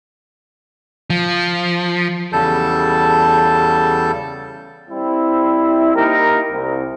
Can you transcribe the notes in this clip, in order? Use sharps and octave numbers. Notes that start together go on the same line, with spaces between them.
F3
E2 C#3 G3 A4 A5 G6
G3 C4 E4
A#3 D#4 E4 G4 A#4
C2